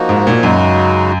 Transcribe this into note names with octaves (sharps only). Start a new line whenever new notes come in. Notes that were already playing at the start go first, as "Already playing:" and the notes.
Already playing: F3 A#3 D#4 F#4
G#2
A#2
F#2 C#3 G#3 D#4 F#4